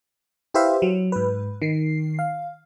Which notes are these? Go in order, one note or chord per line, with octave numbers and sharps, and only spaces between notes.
E4 G4 B4 C5 E5 F5
F#3
G#2 B4
D#3 C7
F5